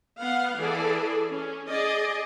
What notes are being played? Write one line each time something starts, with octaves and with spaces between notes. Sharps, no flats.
B3 F5 F#5
E3 G#4 A4 D5
C#4
G#4 D5 D#5